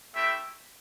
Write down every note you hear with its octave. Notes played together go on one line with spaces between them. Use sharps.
A3 C4 E4 G4 E5